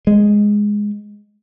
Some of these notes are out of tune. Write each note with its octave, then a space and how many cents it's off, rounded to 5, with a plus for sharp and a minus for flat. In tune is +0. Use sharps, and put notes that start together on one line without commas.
G#3 -5